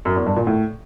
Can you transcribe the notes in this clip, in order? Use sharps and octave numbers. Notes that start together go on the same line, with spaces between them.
F#2
E2
G2
A#2
A2